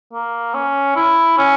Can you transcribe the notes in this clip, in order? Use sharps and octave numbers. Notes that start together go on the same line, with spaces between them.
A#3
C#4
E4
C#4